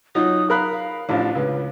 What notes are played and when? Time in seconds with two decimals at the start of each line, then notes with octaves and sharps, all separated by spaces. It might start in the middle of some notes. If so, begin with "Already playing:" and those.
0.15 F#3 D#4 F4 D#6
0.50 A#4 F5 B5 F#6
0.72 F5
1.09 A1 F3 D4
1.35 C#2 B4